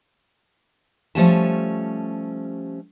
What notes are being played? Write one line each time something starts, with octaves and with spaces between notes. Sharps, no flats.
F3 G3 A3 C#4 G4 A5